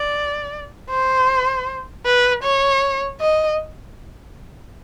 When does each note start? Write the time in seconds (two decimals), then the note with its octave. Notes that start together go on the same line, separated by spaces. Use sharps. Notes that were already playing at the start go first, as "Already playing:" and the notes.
Already playing: D5
0.90 C5
2.05 B4
2.44 C#5
3.21 D#5